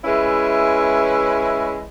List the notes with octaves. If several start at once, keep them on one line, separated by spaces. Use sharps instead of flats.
G#3 C#4 E4 B4 E5